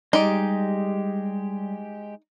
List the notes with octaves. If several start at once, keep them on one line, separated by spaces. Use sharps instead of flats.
G3 G#3 D#4 G4 D5